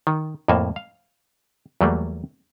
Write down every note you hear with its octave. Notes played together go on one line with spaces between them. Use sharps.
D#3
F2 A2 A#3 G#5 A5
F5
E2 F#3 G3 A3 A#3